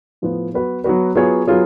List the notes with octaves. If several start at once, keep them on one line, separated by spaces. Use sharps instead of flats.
A2 F3 B3
F#3 B3 F#4 B4
F#3 B3 F#4 B4
F#3 B3 F4 G#4 C#5
F#3 B3 F4 G#4 C#5